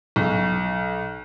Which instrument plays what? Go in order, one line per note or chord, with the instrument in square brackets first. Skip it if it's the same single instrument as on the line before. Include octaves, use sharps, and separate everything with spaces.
[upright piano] B1